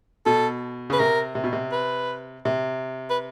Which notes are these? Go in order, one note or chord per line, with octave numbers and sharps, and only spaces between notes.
B2 A4
C#3 B4
C3 A#4
C3
B2
C3
B4
C3
B4